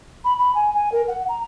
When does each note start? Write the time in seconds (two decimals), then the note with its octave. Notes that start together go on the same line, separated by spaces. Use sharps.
0.24 B5
0.38 B5
0.55 G#5
0.74 G#5
0.92 A#4
1.08 F#5
1.28 A#5